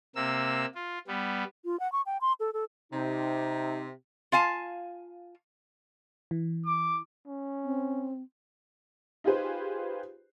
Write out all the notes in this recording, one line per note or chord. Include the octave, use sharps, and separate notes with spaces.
C3 A#3 E6
F4
G3 B3
F4
F#5
C#6
G5
C6
A4
A4
C3 D#4
F4 F5 G#5 A5
E3
D6
C#4
C4
D#4 F4 G4 G#4 B4 C5